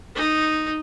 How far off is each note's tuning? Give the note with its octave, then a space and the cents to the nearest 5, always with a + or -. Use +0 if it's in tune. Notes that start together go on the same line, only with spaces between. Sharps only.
D#4 -5